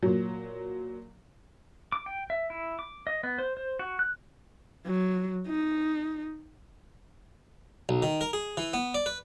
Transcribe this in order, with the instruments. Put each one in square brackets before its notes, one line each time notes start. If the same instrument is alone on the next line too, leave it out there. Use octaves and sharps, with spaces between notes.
[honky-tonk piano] A#2 F#3
[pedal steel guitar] D6
G5
E5
E4
D6
D#5
B3
C5
C5
F#4
F#6
[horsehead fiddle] F#3
D#4
[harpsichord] B1
D#3
A#4
G#4
E3
B3
D5
B4